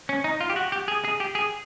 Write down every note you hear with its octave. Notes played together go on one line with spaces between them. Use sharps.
C#4
D#4
F4
G4
F#4
G4
G#4
G#4
G4
G#4